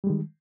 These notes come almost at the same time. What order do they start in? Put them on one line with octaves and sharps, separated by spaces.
G3 G#3 D#3